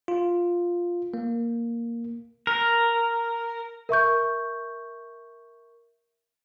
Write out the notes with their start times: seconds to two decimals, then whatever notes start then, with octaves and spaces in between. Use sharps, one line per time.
0.08 F4
1.14 A#3
2.47 A#4
3.89 A#4 E5 C#6 G6